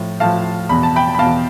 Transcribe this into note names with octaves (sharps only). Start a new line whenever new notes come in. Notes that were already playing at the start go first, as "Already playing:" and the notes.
Already playing: A2 F3
A2 F3 F5 A5
E2 B2 B5
A5
G5 B5
B5
E2 B2 F5 A5